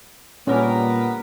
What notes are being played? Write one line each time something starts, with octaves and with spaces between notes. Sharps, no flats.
A#2 D3 G3 B3 C#4 A#4